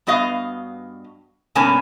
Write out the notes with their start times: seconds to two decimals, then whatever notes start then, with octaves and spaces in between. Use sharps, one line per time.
0.07 G2 B3 F#4 D#5 F5
1.55 G2 B2 A#3 C#4 G#5 A5